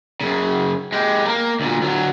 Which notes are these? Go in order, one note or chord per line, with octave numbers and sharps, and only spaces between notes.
F#2 C#3
G#3 G4
A3 A#3
D2 A#2
D2 F#3